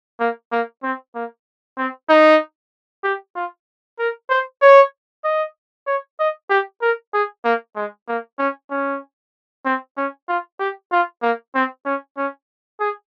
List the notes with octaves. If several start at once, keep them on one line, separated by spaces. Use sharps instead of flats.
A#3
A#3
C4
A#3
C4
D#4
G4
F4
A#4
C5
C#5
D#5
C#5
D#5
G4
A#4
G#4
A#3
G#3
A#3
C#4
C#4
C4
C#4
F4
G4
F4
A#3
C4
C#4
C#4
G#4